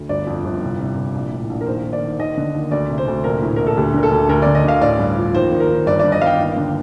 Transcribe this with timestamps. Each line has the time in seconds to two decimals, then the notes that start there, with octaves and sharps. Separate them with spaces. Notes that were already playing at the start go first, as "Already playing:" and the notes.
Already playing: D2
0.09 G1 D5
0.27 F2
0.45 G1
0.62 C2
0.80 C3
0.96 C2
1.15 A#1
1.32 A2
1.49 A#1
1.61 A#4
1.66 D#2 C5
1.84 D#3
1.93 D5
2.01 D#3
2.19 D#2 D#5
2.37 D3
2.54 D#2
2.71 D2 D5
2.89 C3
2.98 C5
3.07 D2
3.24 A#1 A#4
3.42 A2
3.56 A#1 A#4
3.67 A4
3.77 D2 G4
3.94 D3 A#4
4.03 A4
4.11 D2
4.29 D2 A#4
4.42 D3 D5
4.55 D#5
4.64 D2 F5
4.81 A1 D5
4.99 G2
5.16 F3
5.34 D#2 C5
5.52 D#3
5.60 A#4
5.69 D#3
5.86 G1 D5
6.00 G2 D5
6.12 D#5
6.21 G1 F5
6.26 G5
6.39 D#2
6.57 D3